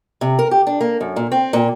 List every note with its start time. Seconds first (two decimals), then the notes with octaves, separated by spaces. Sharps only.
0.21 C3
0.39 A#4
0.51 G4
0.67 D4
0.81 A#3
1.01 F#2
1.16 A#2
1.32 C4
1.53 A#2